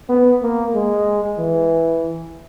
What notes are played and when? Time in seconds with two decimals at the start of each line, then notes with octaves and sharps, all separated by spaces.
0.09 B3
0.42 A#3
0.75 G#3
1.39 E3